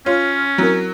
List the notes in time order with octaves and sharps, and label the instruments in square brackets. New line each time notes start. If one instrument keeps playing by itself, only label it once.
[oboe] C#4 [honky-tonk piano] F4 [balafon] C#5
[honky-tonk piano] F#3 [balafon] C4 E4 A#4